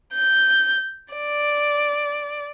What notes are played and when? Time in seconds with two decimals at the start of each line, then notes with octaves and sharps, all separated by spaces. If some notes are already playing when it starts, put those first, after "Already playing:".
0.14 G6
1.14 D5